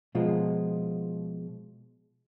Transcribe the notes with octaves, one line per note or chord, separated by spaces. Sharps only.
B2 F3 G#3 F4